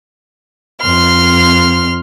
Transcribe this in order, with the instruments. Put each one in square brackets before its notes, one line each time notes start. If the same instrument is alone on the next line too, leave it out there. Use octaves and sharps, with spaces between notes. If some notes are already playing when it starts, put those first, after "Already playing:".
[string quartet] F2 C6 F6